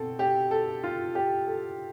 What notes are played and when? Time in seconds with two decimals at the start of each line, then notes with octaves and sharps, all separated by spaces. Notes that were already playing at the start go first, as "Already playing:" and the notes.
Already playing: B2 C4 A4
0.19 G4
0.51 A4
0.84 F4
1.15 G4
1.47 A4